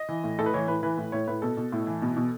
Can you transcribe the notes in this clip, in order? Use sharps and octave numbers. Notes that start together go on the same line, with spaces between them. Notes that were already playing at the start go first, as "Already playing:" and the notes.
Already playing: D#5
E3
A2
A2 A4
B4
E3 C#5
A2 B4
E3 B4
A2
A2 C#5
A2 B4
B2 A4
B2
A2
E3
B2
B2